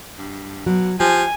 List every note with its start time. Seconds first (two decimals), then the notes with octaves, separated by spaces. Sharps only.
0.18 G2
0.66 B2 F#3
1.00 F3 G4 G#5